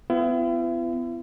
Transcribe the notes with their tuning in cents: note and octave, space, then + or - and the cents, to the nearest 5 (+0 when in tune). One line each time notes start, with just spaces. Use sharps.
B3 +40 E4 +45